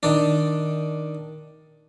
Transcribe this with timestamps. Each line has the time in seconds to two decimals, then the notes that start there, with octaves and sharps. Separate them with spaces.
0.03 D#3 D4